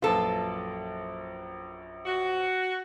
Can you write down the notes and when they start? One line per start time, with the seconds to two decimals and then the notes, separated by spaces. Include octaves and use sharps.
0.02 A#1 F#2 F4 A4 B4
2.06 F#4